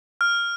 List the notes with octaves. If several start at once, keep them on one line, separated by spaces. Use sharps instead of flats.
F6